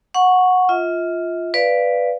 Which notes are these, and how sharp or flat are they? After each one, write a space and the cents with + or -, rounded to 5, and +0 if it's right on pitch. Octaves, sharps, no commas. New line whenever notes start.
F#5 -15 C#6 +0
F4 +0 E5 -45
B4 +0 D5 +0 F5 -10